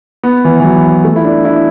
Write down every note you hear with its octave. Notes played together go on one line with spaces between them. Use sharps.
B3
E3
E3
F#3
A3
E4
D4
E4